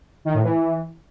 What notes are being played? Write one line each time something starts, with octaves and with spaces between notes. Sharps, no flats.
D#3
A2
E3